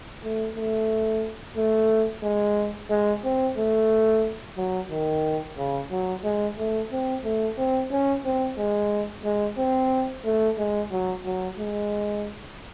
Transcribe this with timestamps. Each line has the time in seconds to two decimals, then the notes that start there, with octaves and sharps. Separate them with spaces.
0.23 A3
0.56 A3
1.56 A3
2.23 G#3
2.90 G#3
3.24 C4
3.57 A3
4.57 F#3
4.91 D#3
5.58 C#3
5.91 F#3
6.24 G#3
6.57 A3
6.92 C4
7.24 A3
7.57 C4
7.91 C#4
8.25 C4
8.58 G#3
9.24 G#3
9.58 C4
10.25 A3
10.58 G#3
10.92 F#3
11.25 F#3
11.59 G#3